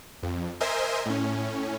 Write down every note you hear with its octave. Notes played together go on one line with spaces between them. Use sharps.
F2
A#4 C5 D#5 E5 G#5 C6
A2 C#4